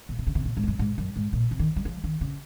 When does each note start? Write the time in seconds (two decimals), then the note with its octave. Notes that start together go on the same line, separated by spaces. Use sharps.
0.09 A#2
0.19 C3
0.27 C#3
0.35 C3
0.45 A#2
0.57 G#2
0.63 F2
0.68 F#2
0.79 G#2
0.98 F#2
1.16 G#2
1.33 A#2
1.51 C3
1.59 D#3
1.76 F#3
1.85 F3
2.04 D#3
2.21 C#3